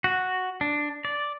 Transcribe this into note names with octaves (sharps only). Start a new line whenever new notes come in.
F#4
D4
D5